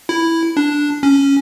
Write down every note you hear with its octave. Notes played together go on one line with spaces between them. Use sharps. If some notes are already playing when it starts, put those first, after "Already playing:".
E4
D4
C#4